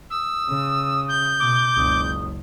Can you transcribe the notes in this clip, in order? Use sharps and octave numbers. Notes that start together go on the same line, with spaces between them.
D#6 E6
C#3
G6
B2 D6
F#1 C#2 D#6